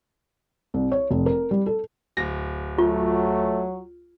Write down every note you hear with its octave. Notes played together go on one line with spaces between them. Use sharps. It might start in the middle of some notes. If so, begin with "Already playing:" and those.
C2
C#5
F1
A#4
G3
A4
D1 A#6
F#3 A3 F4